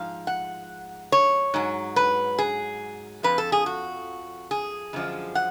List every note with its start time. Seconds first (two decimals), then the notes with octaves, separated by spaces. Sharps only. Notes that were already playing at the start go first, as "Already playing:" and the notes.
Already playing: G#2 F3 F5
0.27 F#5
1.12 C#5
1.54 G#2 F#3
1.96 B4
2.39 G#4
3.23 F2 F3 B4
3.38 A4
3.52 G#4
3.66 F#4
4.51 G#4
4.93 F#2 D3 F3 G#3
5.35 F#5